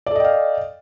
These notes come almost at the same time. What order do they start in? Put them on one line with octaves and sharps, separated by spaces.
D5 A4 D#5 G5 F5